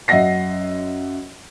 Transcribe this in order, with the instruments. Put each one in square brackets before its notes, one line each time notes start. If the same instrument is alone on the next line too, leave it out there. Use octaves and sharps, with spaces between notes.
[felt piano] F#2 D#5 E5 F#5 A#6 C7